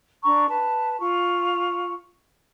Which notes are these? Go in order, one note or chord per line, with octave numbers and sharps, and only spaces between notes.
D4 A#5 C#6
B4 A5
F4 C#6